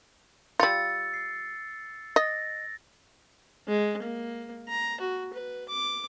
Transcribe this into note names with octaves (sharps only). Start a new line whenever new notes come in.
G3 F4 E6 A6 C#7
C7
D#5 A6 A#6
G#3
A#3
A#5
F#4
B4
D6